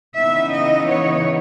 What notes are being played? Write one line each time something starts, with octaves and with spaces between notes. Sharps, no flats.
C#3 E3 B3 D#4 E5
D#5
C#5